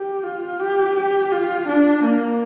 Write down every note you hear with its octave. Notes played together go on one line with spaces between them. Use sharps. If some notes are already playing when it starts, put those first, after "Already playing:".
Already playing: G4
F4
G4
G4
F4
D4
A#3